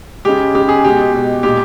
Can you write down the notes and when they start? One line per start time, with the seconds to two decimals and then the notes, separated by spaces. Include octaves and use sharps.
0.25 C#3 G#3 G4
0.55 C#3 G#3 G4
0.69 G#4
0.84 B2 G#3 G4
1.14 B2 G#3
1.43 A#2 G#3 G4